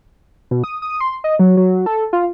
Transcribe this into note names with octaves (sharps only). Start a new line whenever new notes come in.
B2
D#6
D#6
C6
D#5
F#3
F#3
A4
F4